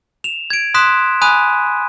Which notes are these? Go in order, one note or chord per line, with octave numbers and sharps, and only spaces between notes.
E7 F7
G#6 D7
C6 D#6 F#6 B6 E7
G#5 B5 D#6 F#6 D#7